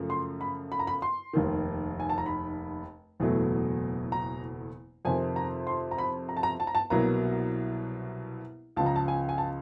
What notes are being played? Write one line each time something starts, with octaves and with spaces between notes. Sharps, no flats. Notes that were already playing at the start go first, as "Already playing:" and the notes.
Already playing: F#2 C#3 F3 A3
C6
B5
B5
A#5
B5
C6
F1 D#2 D#3
G#5
A5
A#5
B5
F#1 E2 B2 F#3 A3
A#5
F2 C3 D#3 G#5
A#5
C6
A#5
B5
A#5
A5
A#5
A5
A#5
A5
C2 B2 F#3 A#3 A#5
C#2 C#3 F3 A5
A#5
A5
G#5
G#5
A5